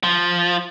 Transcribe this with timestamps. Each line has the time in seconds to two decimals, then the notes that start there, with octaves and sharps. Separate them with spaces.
0.03 F3